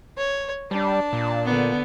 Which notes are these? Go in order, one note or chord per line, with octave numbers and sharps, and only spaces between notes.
C#5
G3 D4 A5
A#2
D3 B3